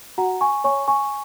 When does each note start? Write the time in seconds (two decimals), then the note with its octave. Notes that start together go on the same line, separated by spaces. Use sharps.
0.18 F#4 F#5 A#5
0.41 G#5 C#6
0.64 C#5 G#5 C#6
0.88 G#5 C#6